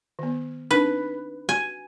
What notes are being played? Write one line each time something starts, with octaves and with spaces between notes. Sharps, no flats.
D#3 B3
C4 D4 D#4 B4
F#4 G#5